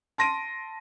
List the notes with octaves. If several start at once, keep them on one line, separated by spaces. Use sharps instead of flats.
A5 C6 A#6 D7 D#7